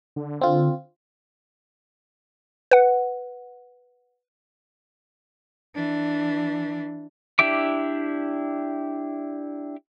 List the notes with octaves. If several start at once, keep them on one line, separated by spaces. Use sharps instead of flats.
D3
C4 F4
B4 F#5
E3 D4
D4 E4 G4 E5 D6